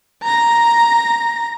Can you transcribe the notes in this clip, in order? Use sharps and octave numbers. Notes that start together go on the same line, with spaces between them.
A#5 A#6